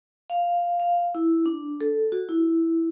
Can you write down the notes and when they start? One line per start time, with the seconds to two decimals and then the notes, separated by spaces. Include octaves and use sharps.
0.30 F5
0.80 F5
1.15 E4
1.46 D4
1.81 A4
2.12 F#4
2.29 E4